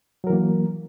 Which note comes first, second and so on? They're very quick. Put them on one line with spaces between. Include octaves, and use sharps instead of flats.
F#3 A#4 E3 A#3